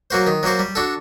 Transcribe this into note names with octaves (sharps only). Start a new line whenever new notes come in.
F#3 A#3 F#4 C5
D#3
F#3 A#3 F#4 C5
G3
D4 F#4 A4